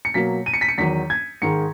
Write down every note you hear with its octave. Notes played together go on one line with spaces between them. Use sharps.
C#7
B2 F#3 A#3 B6
D#7
C#7
B6
C#7
E2 D#3 F#3 B6
G#6
G#2 D#3 G#3 C#7